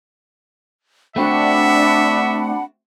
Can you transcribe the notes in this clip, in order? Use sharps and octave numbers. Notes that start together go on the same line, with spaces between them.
A3 C4 D4 F#4 E5 F#5 B5